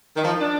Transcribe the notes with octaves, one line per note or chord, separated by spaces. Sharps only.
D#3
F3
D4